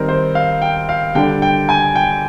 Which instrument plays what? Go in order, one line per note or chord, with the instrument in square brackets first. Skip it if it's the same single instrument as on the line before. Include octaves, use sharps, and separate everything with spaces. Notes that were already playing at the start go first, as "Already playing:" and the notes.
Already playing: [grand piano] D#3 G3 C4 D#4 A#4
C5
F5
G5
F5
D3 G3 D4 G5
G5
G#5
G5